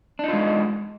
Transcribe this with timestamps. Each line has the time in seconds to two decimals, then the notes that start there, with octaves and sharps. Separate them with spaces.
0.19 D4
0.24 D#4
0.28 F4
0.33 G#3